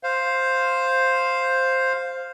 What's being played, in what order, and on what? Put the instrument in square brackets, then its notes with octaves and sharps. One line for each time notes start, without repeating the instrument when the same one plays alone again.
[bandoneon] C5 F5